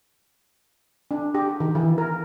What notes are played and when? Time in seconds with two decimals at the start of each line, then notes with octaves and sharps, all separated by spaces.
1.11 D4
1.35 G4
1.60 D#3
1.75 E3
1.98 A#4